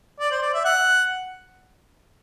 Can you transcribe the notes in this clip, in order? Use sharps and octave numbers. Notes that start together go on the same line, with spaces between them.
D5
C5
D5
E5
F#5